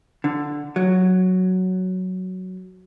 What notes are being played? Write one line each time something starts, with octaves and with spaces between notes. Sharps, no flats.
D3
F#3